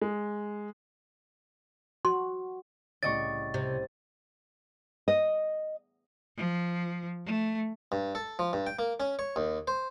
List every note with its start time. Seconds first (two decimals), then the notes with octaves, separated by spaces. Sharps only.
0.02 G#3
2.05 F#4 C6
3.03 C2 A2 C#3 D5 D#5 C#6 A6
3.54 C3
5.08 D#5
6.37 F3
7.26 A3
7.92 G2
8.15 A4
8.39 F3
8.53 G2
8.67 G5
8.79 A#3
9.00 C#4
9.19 C#5
9.36 D#2
9.67 C5